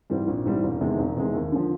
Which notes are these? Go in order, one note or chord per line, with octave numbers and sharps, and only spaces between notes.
G#2 E3 G3 C4
A#1
G#2 E3 G3 C4
E1
E2 C3 D#3 G#3
E1
E2 C3 D#3 G#3
D#2
D3 F3